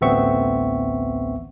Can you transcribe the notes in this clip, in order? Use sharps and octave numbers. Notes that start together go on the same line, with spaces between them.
A1 D2 B3 C4 E5 C#6